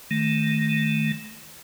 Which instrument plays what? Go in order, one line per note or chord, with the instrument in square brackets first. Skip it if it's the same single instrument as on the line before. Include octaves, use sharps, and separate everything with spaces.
[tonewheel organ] D#3 A3